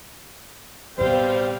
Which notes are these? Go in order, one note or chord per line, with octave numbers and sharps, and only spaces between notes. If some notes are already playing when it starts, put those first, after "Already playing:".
A1 B2 G3 C4 C5 F5 G5